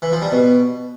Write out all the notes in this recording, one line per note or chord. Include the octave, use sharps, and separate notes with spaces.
E3
F3
G3
B2